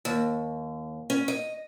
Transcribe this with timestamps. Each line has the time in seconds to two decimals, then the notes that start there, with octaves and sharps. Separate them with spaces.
0.05 D#2
1.10 C#4
1.28 D#5